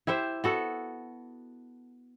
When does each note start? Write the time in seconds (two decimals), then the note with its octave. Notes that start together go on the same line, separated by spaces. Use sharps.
0.07 E4 G4 C5 E5
0.44 B3 F#4 A4